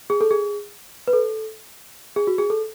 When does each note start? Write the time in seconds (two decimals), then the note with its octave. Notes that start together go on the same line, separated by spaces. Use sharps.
0.10 G#4
0.21 A4
0.31 G#4
1.08 B4
1.13 A4
2.16 G#4
2.27 F#4
2.38 G#4
2.50 A4